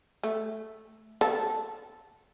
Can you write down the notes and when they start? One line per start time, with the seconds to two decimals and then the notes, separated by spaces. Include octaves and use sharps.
0.23 A3
1.21 A4